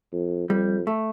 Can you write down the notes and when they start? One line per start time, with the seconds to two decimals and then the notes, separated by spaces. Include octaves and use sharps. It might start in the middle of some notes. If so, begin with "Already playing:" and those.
0.13 F2
0.50 F2 G3
0.87 A3